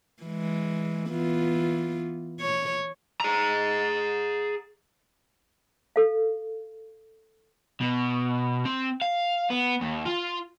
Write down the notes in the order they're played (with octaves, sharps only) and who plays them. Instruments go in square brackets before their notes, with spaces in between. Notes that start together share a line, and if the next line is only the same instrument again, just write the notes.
[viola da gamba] E3 G#3
E3 B3 F4
C#5
[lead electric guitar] G#4 A#5
[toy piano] A4 F5
[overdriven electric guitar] B2
C4
F5
B3
D#2
F4